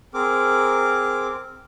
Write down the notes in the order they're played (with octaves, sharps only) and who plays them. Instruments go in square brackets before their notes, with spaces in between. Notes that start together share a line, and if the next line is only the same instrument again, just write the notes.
[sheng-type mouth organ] C4 G#4 A#4 D6